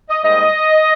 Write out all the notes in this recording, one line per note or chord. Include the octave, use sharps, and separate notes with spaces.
D#5
G#2 G3 A#3 D#5